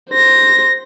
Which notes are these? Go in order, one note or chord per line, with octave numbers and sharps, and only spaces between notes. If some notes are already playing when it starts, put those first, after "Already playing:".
C5 A#6